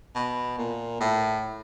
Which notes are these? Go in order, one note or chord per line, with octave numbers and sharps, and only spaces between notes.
B2
A#2
A2